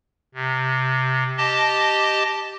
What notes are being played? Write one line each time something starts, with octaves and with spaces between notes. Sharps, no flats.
C3
G4 D#5 A5